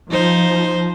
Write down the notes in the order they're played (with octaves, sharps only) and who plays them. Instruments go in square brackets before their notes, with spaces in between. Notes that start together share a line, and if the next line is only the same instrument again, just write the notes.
[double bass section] F3 [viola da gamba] D#4 C5